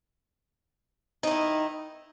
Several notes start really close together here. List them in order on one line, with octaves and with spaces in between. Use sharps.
D#4 D#3 E4